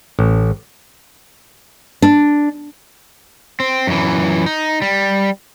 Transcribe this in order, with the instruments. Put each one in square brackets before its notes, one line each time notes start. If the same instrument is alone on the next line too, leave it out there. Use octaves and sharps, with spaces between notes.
[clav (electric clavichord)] A1
[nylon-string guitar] D4
[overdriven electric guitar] C4
F#2 E3
D#4
G3